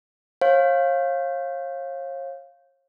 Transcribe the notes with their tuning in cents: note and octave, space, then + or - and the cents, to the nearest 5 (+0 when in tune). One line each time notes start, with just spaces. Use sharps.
C#5 -40 F5 +0